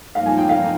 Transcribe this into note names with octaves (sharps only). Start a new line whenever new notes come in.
G2 F3 A#3 D#4 F5
G#5
G5
F5